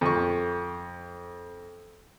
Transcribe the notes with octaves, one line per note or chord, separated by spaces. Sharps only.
F2 C#6